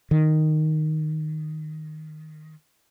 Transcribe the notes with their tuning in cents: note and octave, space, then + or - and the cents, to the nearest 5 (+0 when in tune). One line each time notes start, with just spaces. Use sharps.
D#3 -5